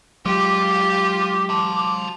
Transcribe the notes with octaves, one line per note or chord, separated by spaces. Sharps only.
F#3 G#3 F4 G4 D6
A5 C6